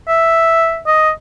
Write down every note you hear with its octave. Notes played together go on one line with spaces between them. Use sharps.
E5
D#5